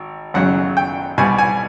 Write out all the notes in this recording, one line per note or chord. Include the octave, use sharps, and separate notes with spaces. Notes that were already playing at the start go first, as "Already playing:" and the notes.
Already playing: G#1
G#1 F#2 C#3 F#3 F#5
G5
C2 B2 G3 G#5
G#5